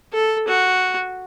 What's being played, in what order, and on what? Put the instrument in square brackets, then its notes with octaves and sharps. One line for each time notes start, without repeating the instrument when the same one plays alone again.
[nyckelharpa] A4
F#4